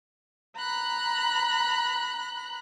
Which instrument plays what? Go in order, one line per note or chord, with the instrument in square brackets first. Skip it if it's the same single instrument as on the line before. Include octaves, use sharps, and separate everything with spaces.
[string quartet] A#5 B5 F#6